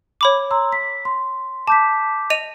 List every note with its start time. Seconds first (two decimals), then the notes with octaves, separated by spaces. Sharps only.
0.21 C#5 B5 D6
0.51 A#5 C6 E6
0.72 B6
1.05 C6
1.68 A5 D6 G6 B6
2.30 D#5 D#7 F7